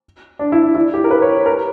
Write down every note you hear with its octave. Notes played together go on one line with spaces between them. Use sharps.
D4
E4
E4
G4
A#4
B4
C#5
A#4